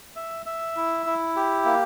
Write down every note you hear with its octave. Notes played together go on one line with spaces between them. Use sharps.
E5
E5
E4
E4
G4
A#3